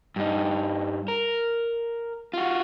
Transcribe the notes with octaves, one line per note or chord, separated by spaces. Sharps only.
G2 D#4
A#4
F4 F#4